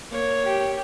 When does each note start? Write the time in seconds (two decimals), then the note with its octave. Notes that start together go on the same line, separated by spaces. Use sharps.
0.10 A#3 C#5
0.45 G4